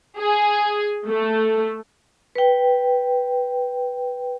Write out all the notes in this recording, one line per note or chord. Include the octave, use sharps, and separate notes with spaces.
G#4
A3
B4 G5